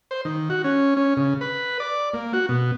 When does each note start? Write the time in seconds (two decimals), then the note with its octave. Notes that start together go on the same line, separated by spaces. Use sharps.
0.11 C5
0.25 D#3
0.50 F#4
0.64 C#4
0.97 C#4
1.17 C#3
1.41 B4
1.80 D5
2.14 A#3
2.33 F#4
2.49 B2